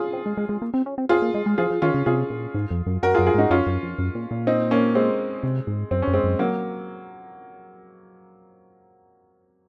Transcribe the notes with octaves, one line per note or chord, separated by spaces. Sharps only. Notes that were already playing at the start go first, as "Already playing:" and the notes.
Already playing: F4 G#4
C4
G#3
G#3
G#3
A#3
C4
C#4
C4
C4 F4 G#4
A#3
G#3
G#3
F3 F4 G#4
F3
D#3 C#4 F4
C#3
C3 F4 G#4
A#2
G#2
F2
F#2
F#2 F#4 A#4
F4 G#4
F#2
F4 G#4
G#2 D#4 F#4
F#2 C#4 F4
F#2
F2
F#2
A#2
A#2
C4 D#4
A#3 C#4
G#3 C4
C3
G#2
F#2 C4
C#4
F#2
G#3 C4
F#2
F#3 A#3